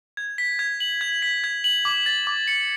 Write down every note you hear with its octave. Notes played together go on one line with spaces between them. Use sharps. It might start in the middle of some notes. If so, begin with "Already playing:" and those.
G#6
B6
G#6
F#7
G#6
B6
G#6
F#7
D6
A6
D6
C#7